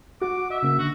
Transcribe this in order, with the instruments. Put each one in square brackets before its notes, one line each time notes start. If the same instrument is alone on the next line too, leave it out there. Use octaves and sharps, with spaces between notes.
[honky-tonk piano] F#4 [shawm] D6
[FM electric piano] D#5 [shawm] E5
[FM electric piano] C#3 A#3
[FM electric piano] D3 [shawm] F#4